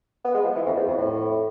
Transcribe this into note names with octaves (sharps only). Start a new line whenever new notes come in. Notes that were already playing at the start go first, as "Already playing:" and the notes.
B3
G#3
F3
E3
F2
E2
F2
A2